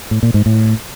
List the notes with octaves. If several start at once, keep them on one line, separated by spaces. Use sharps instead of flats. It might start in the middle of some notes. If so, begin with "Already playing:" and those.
A2
A#2
G#2
A2